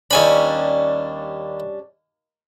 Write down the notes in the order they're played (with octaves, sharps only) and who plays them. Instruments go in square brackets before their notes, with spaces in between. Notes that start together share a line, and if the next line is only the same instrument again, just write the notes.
[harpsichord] D#2 G#5 B5 [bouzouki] G3 C#4 D4